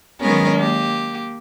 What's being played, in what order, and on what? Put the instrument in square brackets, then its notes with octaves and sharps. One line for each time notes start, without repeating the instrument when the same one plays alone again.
[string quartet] D#3 F#3 G#3 B3 C#4 A#4
A#3 G4